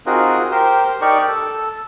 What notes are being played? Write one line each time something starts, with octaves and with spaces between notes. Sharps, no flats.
C4 D#4 F4 F#4 G#4 A#4
G4 A#4 C5
D#4 G4 A#4 D5 G5 C#6
A4